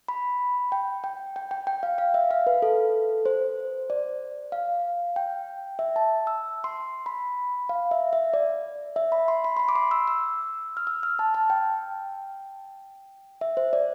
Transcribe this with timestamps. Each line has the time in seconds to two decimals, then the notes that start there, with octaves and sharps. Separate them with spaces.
0.08 B5
0.72 G5
1.04 G5
1.36 G5
1.51 G5
1.67 G5
1.83 F5
1.98 F5
2.14 E5
2.31 F5
2.47 B4
2.62 A4
3.26 C5
3.90 D5
4.52 F5
5.16 G5
5.79 E5
5.96 A5
6.27 E6
6.64 C6
7.06 B5
7.69 F5
7.91 E5
8.13 E5
8.34 D5
8.96 E5
9.12 B5
9.28 C6
9.44 B5
9.57 C6
9.60 B5
9.69 D6
9.76 C6
9.91 E6
10.08 E6
10.77 F6
10.87 E6
11.03 F6
11.19 A5
11.34 A5
11.50 G5
13.41 E5
13.57 C5
13.73 D5